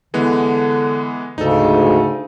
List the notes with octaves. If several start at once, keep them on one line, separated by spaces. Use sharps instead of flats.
D3 E3 G#3 B3
D2 G#2 C#3 D#4 A4